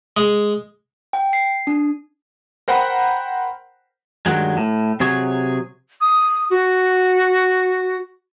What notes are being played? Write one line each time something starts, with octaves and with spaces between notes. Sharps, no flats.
G#3
G5
C7
D4
A#4 C5 F#5 G5 A#5 B5
G2 D#3 F#3 G#3
A2
C3 F#3 G#4 C#5
D#6
F#4